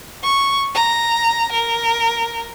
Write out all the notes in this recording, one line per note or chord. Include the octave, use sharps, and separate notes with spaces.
C#6
A#5
A#4